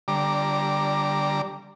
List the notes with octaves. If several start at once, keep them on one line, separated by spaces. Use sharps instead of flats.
D3 G3 A#5 D6